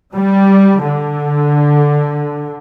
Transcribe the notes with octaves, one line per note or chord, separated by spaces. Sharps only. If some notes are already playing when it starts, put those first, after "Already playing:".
G3
D3